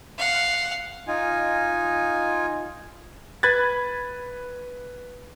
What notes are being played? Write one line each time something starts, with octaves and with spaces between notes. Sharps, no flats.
F5 F#5
D#4 F4 G#5
B4 B5 F#6 G#6 A6